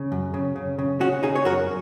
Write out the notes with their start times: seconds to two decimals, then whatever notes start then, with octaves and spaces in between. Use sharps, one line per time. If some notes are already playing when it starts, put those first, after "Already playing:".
Already playing: C#3
0.12 F#2
0.34 C#3
0.56 C#3
0.79 C#3
1.00 C#3 C#4 F#4
1.23 C#3 D#4 G#4
1.36 C#5
1.45 F#2 F#4 A#4